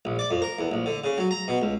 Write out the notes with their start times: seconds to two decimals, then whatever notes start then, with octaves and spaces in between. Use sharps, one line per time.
0.05 A#1
0.19 D5
0.31 F2
0.42 A#4
0.59 E2
0.72 A#1
0.86 D3
1.04 C#3
1.18 F#3
1.31 A#5
1.48 B2
1.62 C#2